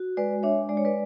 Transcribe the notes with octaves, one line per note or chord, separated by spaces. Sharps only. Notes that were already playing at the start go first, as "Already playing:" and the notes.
Already playing: F#4
G#3 B4 D5
D4 C#5 E5
G#3 D5
C#5
B4 D5